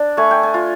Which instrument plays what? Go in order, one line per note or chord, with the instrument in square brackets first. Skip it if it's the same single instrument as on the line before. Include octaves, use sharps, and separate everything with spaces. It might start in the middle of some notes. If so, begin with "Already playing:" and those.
Already playing: [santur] D4
A3 G#5
G5
G#5
F4